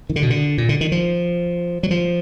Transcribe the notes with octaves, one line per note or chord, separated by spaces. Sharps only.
D#3
D3
B2
D3
A#2
D3
D#3
F3
F#3
F3